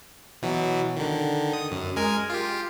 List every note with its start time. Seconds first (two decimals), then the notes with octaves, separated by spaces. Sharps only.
0.42 B2 E3 F#3
0.96 D3 D#3
1.53 D#6
1.71 F#2
1.96 G#3 A#4 G#5
2.30 F4 G4